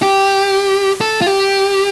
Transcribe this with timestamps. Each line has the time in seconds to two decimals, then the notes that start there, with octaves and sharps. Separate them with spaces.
0.02 G4
1.01 A4
1.21 F4
1.27 G4